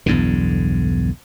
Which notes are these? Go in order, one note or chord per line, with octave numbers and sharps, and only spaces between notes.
B1 E2 G2 D3